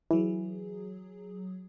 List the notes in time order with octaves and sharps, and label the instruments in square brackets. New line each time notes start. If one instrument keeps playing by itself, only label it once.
[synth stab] E3 [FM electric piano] F#3 G#4